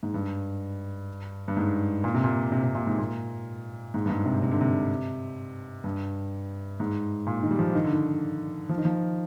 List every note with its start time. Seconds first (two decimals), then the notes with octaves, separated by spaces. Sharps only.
0.03 G#2
0.14 G2
1.48 G2
1.57 G#2
2.04 A#2
2.15 C3
2.24 A#2
2.52 C3
2.64 C3
2.75 A#2
2.87 G#2
2.98 A#2
3.94 G#2
4.06 G2
4.09 G#2
4.26 C3
4.42 C3
4.51 D3
4.61 C3
5.84 G2
6.80 G#2
7.27 A#2
7.43 D#3
7.51 G3
7.59 F3
7.75 D#3
7.84 D3
7.93 D#3
8.69 F3
8.78 D#3
8.85 F3